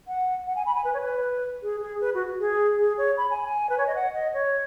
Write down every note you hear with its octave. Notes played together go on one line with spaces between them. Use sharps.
F#5
F#5
G#5
B5
G#5
B4
C#5
B4
G#4
G#4
B4
F#4
G#4
G#4
C#5
B5
G#5
G#5
B4
C#5
D#5
F#5
D#5
C#5